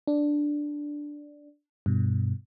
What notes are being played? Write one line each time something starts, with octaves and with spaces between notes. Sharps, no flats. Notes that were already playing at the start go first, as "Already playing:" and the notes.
D4
G2 B2